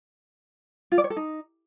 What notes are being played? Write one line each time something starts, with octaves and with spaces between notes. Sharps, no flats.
F4
D5
C#5
A4
D#4